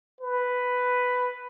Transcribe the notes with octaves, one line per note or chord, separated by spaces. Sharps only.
B4